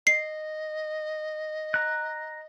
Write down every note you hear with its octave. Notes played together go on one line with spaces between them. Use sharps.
D#5 C7
A#5 F#6